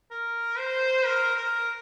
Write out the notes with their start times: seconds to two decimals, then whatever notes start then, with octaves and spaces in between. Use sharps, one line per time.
0.11 A#4
0.58 C5
1.05 A#4
1.36 A#4